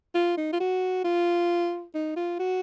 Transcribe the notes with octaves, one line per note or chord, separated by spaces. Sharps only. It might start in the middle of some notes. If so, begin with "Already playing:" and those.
F4
D#4
F4
F#4
F4
D#4
F4
F#4